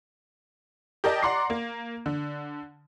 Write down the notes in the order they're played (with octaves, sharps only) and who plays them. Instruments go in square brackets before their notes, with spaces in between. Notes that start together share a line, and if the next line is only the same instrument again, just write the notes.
[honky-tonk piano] G4 A#4 D5 D#5 A5
D5 F#5 A#5 C6 D6 C7
A#3
D3